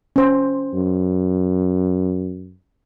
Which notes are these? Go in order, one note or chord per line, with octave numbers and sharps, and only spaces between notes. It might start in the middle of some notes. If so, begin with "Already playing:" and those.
C#4 C5
F#2